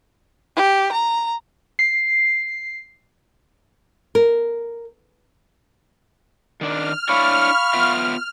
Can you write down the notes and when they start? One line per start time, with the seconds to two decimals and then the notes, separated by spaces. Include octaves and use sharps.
0.56 G4
0.92 A#5
1.79 C7
4.15 A#4
6.61 D#3 D4 F6
7.09 D4 E4 C#5 F5 B5 C#6
7.73 B3 F4 E5